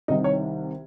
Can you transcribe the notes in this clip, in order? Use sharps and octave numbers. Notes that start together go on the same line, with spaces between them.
C2 C3 D#3 D#4
C#5